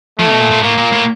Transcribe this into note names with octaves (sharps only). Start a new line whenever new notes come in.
F3 A3
B2
A#2
A#2
A2 A#3
A#2
A2